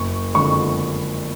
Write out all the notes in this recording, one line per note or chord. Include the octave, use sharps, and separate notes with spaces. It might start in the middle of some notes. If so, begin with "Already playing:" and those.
Already playing: F#1 C#6
F2 D3 G#3 C#6